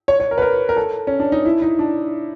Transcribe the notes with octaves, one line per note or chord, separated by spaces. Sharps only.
C#5
C#5
A#4
B4
A#4
A#4
A4
C#4
D4
D#4
E4
D#4
D4